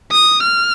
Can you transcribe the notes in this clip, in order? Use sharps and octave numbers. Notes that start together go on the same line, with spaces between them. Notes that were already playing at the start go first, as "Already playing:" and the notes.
D#6
F6